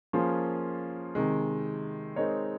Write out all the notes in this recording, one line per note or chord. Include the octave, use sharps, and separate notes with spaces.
F3 A#3 C#4 F4 G#4
C3 D#3 G#3
G#3 C4 D#4 A#4 C#5